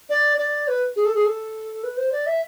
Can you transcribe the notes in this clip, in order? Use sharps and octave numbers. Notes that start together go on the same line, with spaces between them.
D5
D5
B4
G#4
A4
G#4
A4
B4
C5
D5
E5